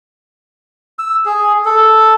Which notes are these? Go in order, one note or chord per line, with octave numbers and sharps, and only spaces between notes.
E6
G#4
A4